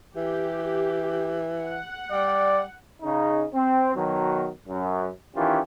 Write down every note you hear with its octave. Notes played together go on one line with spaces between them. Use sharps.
E3 G4
F#5
G3 D5
C#3 D#4
C4
B2 D#3 F#3
F#2
D#3 E3 C#4 F4 G4